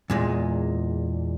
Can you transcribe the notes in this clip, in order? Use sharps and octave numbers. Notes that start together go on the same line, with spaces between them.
E2 A#2 G#3